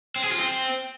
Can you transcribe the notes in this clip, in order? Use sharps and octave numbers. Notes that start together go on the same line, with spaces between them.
C4
G#4
F4
C4